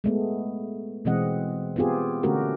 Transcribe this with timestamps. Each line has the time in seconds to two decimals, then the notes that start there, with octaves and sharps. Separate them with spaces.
0.04 G#3 A3 B3
1.05 B2 E3 G#3 C4 D#5 F#5
1.76 B3 C4 F4 G4 G#4
2.23 D3 A3 C#4 F#4 G4 A#4